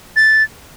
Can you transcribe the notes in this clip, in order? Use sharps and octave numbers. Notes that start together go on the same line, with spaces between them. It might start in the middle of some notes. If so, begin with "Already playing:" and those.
A6